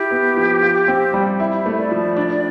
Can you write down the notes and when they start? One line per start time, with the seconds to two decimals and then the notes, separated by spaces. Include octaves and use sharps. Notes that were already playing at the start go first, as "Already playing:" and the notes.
Already playing: E4 G4
0.11 B3
0.37 F3
0.62 F4
0.88 C4
1.14 G3
1.40 E4
1.66 A3
1.78 D5
1.91 F3
2.16 D4